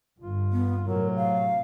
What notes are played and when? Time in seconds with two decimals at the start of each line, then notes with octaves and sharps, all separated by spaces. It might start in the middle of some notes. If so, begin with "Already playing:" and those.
0.20 G1 G2 F4
0.52 B3
0.87 A2 C3 F#3 A#4
1.16 F5